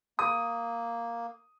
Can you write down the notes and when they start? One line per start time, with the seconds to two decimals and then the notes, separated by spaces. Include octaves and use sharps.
0.19 A#3 D#6